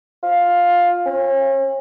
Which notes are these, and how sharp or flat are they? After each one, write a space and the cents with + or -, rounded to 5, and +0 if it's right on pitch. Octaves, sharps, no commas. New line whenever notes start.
F4 +10
C#4 -40